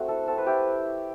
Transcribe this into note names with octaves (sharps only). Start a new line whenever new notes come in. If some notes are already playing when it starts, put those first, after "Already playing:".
Already playing: A3 C4 F#4
E4 A4
C4 A4
B4
E4 G4